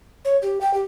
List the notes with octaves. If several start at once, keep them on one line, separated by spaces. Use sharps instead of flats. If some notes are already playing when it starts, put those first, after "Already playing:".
C#5
G4
G5
G4